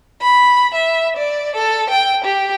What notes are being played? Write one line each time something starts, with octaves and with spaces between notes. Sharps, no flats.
B5
E5
D5
A4
G5
G4